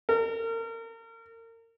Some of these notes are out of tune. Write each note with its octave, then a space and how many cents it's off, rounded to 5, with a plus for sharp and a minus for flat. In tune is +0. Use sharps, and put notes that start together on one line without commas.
A#4 -35